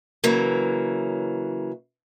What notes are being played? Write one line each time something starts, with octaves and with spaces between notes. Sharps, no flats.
C#3 E3 F#3 A#3